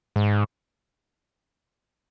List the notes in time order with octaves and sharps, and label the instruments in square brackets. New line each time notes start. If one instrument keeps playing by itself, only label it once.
[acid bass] G#2